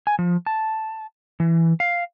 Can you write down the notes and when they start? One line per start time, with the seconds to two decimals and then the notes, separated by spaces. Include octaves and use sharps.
0.07 G#5
0.19 F3
0.46 A5
1.40 E3
1.80 F5